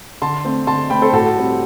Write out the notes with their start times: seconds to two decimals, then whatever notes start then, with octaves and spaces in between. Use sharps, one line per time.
0.22 D3 A5 C6
0.44 A3 C4
0.67 D3 A5 C6
0.90 A3 C4 G5 B5
1.02 A4 C5
1.13 A2 F#4 A4
1.36 G3 C4